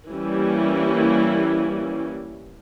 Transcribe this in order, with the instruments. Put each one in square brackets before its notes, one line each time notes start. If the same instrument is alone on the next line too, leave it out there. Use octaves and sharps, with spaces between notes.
[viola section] E3 G3 A#3 C#4 E4